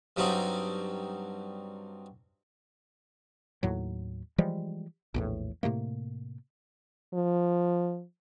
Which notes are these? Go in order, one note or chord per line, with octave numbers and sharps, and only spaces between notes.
G2 F#3 G3 C4 D4 D#4
D#2 A2 F#3
E3 F3 G3 G#3
A#1 E2 A2
A2 C3 A3 A#3
F3